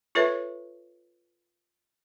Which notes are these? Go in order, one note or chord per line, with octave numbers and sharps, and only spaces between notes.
F4 A4 B4 C#5 E5